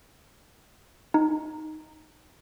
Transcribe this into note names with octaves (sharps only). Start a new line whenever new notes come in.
D#4